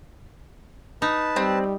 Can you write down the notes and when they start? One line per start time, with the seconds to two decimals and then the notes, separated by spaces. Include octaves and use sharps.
1.02 D#4 B4 A5
1.36 G3 C4